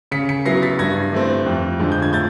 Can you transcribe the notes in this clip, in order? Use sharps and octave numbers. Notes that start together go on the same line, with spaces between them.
C#3 B6 C#7
B6 C#7
F#3 B3 E4 A#6 C7
A6 B6
G2 G#6 A#6
E3 A3 C4
F2
D3 F3 G#3
G6
G#6
A2 G6 A6